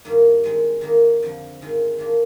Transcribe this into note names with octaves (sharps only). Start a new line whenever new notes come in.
G2 D#3 A#3
D#3 G#3 C4
D#3 G3 A#3 D#4
F2 D3 F3
G#2 D#3 G#3 C4 F4
D#3 A#3 D4 F4